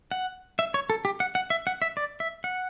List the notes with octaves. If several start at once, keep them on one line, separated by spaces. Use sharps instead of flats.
F#5
E5
C#5
A4
G4
F#5
F#5
E5
F#5
E5
D5
E5
F#5